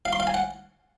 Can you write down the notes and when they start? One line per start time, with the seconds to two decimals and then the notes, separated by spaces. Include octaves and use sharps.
0.05 F5
0.13 C6
0.20 F5
0.27 G#5
0.34 F#5